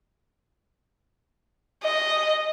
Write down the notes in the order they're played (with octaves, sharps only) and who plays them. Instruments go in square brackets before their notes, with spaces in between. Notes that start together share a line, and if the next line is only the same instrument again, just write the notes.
[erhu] D#5